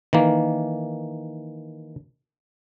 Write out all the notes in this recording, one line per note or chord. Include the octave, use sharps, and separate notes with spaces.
D#3 E3 A#3